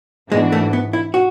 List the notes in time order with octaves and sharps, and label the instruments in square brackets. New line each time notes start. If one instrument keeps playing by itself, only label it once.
[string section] G#2 E3 B3 D4 F#4 [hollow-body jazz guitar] G#3
[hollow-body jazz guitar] A3
B3
E4
F#4